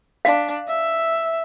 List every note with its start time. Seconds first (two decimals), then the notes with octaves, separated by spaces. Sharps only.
0.25 D4 F5
0.67 E5